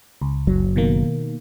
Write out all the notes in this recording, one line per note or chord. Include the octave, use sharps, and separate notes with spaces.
C#2
F#1 F#3
B2 D#3 A#3